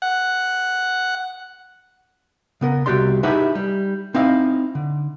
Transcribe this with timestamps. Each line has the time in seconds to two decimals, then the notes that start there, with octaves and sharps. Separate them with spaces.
0.02 F#5
2.61 C#3 B3 A#4
2.86 C2 D#3 F#4 G4 D5 C6
3.23 D#4 E4 G4 G#4 B4 E5
3.55 G3
4.14 C4 D#4 E4 D#5 F5
4.75 D3